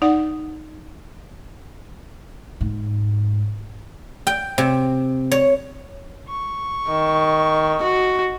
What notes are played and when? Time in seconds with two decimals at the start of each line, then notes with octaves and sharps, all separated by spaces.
0.02 D#4 D5 F#5
2.61 G#2
4.27 G5
4.58 C3
5.32 C#5
6.28 C#6
6.89 D#3
7.82 F#4